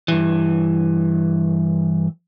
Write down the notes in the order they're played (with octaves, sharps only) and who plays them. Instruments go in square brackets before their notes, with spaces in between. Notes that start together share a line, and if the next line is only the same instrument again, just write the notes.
[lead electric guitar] G2 E3